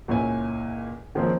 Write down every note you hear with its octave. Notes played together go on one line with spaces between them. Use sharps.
C#2 A#2 E4 C#5 G#5
D#3 F3 G#3 A#3 C4 C#4